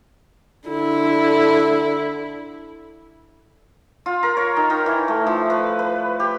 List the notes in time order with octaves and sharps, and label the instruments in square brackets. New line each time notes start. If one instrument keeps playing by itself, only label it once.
[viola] D3 E4
[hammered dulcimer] F4
A#4
C#5
D#3
D#3
E3
A3
F3
B4
B4
G4